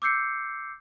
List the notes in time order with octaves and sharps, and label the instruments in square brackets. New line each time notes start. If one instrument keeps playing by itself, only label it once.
[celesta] D6 E6 G6 C7 C#7